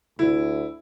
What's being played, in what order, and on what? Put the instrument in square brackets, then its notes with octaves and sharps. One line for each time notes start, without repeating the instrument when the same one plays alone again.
[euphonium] D2 [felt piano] E4